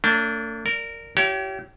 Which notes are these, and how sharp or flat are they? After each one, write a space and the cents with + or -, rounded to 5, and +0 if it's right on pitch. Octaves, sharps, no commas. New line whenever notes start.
A3 +45 D4 -25 C#5 +0
A#4 -15 D5 +0
E4 +40 G4 -30 C#5 +20